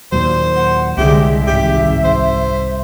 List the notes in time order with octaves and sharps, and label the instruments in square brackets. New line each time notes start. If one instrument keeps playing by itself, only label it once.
[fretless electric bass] D#2 A#2 F#3 [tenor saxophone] C5
[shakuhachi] F#5
[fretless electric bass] C2 [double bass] D3 G#3 [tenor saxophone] G4 [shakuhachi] E5
[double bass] G#1 [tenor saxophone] G4
[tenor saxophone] C5